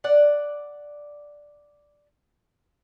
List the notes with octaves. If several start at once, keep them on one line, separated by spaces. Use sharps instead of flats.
D5 F#5